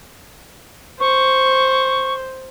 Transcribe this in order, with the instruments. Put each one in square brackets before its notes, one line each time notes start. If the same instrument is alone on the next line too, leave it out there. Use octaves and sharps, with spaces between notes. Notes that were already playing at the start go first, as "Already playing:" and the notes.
[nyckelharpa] C5 [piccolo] C#6